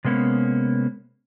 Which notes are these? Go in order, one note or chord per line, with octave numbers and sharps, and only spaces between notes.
C3 G#3 A#3 B3 C#4